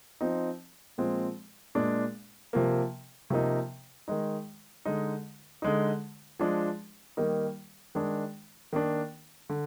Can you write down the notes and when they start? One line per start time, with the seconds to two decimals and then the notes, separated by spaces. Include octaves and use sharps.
0.21 F3 C4 D#4
0.98 A#2 F3 G#3 C4
1.75 A#2 G#3 D4
2.53 C3 F3 A#3
3.30 C3 F3 A#3 D#4
4.08 D#3 G#3 D#4
4.85 D3 G#3 D#4
5.62 D3 G#3 D#4
6.40 F3 G#3 D4
7.17 D#3 G3 A#3 D#4
7.95 D#3 G#3 D4
8.73 D#3 A#3 D4
9.49 D3